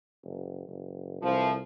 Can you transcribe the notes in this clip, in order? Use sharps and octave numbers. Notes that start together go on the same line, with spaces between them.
F#1
F#1
C2 F2 E3 F3